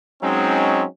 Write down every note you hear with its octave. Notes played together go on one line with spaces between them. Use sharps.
F#3 G#3 C4 C#4 D#4